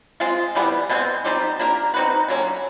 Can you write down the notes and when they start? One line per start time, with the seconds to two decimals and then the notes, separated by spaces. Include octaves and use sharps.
0.20 G#3 C4 F4
0.55 C3 E3 G3 B3
0.89 B2 G#3 C4
1.25 G3 C4 D#4 G4
1.59 A#3 D4 G4 A#4
1.94 C4 D#4 F#4 B4
2.28 D3 F#3 A#3 C#4